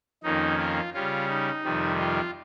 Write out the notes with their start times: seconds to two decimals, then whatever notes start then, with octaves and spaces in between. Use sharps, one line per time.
0.23 F2 D#3 A#3 C#4 D#4
0.58 F4
0.94 C#3 G3 C#4 F4
1.28 D#4
1.63 F2 C3 D#3 G3
2.00 F4